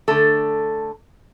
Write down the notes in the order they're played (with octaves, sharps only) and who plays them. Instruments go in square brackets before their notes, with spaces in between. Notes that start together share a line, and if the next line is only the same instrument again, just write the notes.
[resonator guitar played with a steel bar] D3 A3 A4